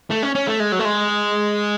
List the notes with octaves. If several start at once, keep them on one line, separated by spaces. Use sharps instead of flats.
A3
C#4
C#4
A3
G#3
F#3
A3
G#3